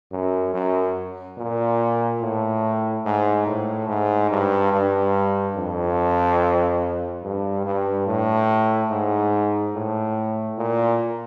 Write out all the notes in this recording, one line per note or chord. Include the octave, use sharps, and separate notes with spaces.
F#2
F#2
A#2
A2
G#2
A2
G#2
G2
G2
F2
G2
G2
A2
G#2
A2
A#2